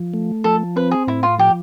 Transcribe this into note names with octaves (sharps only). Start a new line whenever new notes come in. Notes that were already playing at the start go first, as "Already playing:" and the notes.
Already playing: F3
A3
F3 A4
C4 B4
G#4
A2 E4
F4
F3 G4